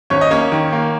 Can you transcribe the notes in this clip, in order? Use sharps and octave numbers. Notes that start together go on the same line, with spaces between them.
G#1 C#4 C#5
D#5
A#3 C#4 C#5
D#3
A#3